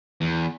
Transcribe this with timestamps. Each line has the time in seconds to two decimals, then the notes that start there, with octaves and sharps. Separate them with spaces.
0.21 E2